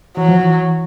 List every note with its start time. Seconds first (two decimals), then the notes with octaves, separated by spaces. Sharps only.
0.17 E3 F#3
0.29 F3
0.40 E3